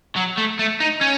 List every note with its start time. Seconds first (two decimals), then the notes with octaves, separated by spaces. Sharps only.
0.16 F#3
0.37 A3
0.59 A3
0.80 D#4
1.01 C#4